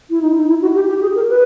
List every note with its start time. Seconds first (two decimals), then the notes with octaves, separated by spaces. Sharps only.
0.10 E4
0.22 D#4
0.36 D#4
0.49 E4
0.62 F#4
0.75 G4
0.89 G4
1.02 G#4
1.15 A#4
1.29 B4